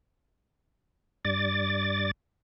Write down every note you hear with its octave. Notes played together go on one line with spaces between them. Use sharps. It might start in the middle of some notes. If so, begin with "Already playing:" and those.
G2 D5 A6